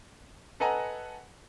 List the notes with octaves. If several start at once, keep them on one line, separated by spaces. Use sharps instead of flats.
A4 B4 D#5 F#5 G#5 A#5